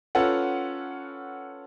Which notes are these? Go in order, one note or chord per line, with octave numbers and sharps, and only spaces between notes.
C#4 F4 A4 B4 F#5